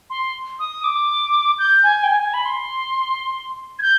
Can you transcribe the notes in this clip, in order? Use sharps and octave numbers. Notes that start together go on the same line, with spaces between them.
C6
D#6
D6
G6
G#5
G5
G#5
G#5
B5
C6
G#6
G6